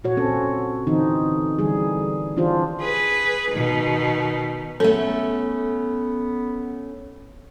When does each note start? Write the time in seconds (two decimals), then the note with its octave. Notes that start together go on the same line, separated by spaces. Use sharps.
0.04 A#2 F#4 C#5
0.17 C4 C#4 A4
0.87 D3 E3 C4 D#4
1.59 D3 E3 G3 G#4
2.37 E3 C#4 D4 F4 G4 C5
2.81 G#4 B4
3.51 B2 D#3
4.80 A3 B3 C#4 A4